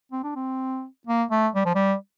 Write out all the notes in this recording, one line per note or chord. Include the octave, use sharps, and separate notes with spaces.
C4
D4
C4
A#3
A3
G3
F3
G3